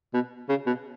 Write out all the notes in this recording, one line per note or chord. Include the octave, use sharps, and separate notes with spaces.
B2
C#3
B2